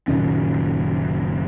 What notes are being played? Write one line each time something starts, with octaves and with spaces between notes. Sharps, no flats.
F#1 A#2 D#3 C#4